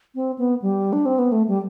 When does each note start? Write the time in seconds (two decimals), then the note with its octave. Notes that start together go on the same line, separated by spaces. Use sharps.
0.15 C4
0.38 B3
0.62 G3
0.93 D4
1.06 C4
1.19 B3
1.32 A3
1.48 G3